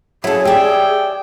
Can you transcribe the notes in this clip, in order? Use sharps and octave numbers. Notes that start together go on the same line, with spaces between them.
F#3 C#4 E4 G#4 A4
G4 D5 E5 G5